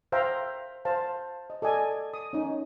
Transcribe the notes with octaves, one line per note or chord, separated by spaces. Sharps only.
C5 E5 F5 G5 A#5
C5 F5 A5
D#5
A4 D5 D#5 G#5
D#6
C#4 D#4